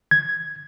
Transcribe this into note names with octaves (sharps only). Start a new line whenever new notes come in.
G#6